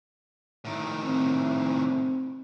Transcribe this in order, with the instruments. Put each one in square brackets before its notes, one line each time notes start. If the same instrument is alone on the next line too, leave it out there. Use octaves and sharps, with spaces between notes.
[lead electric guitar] A2 D#3
[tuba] C4